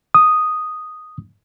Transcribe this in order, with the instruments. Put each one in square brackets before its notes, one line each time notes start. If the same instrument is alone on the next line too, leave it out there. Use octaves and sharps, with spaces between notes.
[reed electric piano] D#6